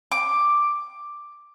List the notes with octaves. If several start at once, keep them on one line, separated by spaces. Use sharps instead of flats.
D6